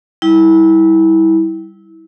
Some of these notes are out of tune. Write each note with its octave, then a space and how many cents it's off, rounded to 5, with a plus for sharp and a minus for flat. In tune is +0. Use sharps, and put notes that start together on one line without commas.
G3 -10 E4 -25